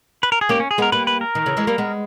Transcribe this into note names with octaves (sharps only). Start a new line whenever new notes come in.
B4
A#4
G#4
A#3 C#4 G4
C#4
G#4
G#3 B3 A#4
G3 A#3 B4
B4
A#4
D#3
C#3 E3
E3 G#3
G3 A#3
G#3 B3